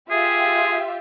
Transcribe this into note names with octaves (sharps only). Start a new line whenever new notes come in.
F4 G4 G#4 E5